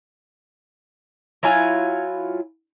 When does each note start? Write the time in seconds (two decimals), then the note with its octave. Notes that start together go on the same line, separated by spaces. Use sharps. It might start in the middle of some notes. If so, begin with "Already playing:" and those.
1.43 F#3 E4 F4 G#5